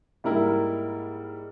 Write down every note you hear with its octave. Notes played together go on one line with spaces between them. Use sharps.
G#2 G3 A#3 E4 A#4